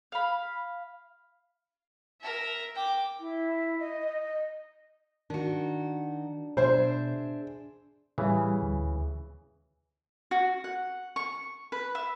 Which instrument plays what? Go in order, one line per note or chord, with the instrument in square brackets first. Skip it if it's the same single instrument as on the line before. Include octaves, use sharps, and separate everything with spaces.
[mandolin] F5 B5
[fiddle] A#4 E5
G5 D6
[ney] E4
D#5
D#5
[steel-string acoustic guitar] D#3 F#4 [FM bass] D4
[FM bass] B2 [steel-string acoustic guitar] D4 G#4 E5 [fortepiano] C5
[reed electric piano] A2 G3 [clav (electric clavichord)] C#3 E3
[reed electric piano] D2
[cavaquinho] F#4
F#5
C#6
B4
E5